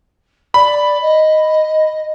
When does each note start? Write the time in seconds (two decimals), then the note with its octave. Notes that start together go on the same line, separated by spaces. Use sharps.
0.54 D5 B5
1.02 D#5